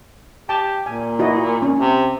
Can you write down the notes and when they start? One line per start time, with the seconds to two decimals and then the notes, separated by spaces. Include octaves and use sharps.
0.49 G4 A5
0.86 A#2 G#5
1.19 E4 F#4 D#5
1.62 C#4
1.79 C3